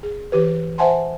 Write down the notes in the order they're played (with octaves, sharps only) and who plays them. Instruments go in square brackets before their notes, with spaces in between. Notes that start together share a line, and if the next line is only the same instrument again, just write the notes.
[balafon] G#4
E3 G4 B4
C5 E5 F#5 G#5 A5 C6